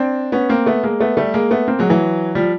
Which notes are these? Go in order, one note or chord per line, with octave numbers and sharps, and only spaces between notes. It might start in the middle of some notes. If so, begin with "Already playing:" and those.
Already playing: C4 D4
B3 C#4
A#3 C4
A3 B3
G#3 A#3
A3 B3
G3 A3
G#3 A#3
A3 B3
A#3 C4
F#3 G#3
E3 F#3
F3 G3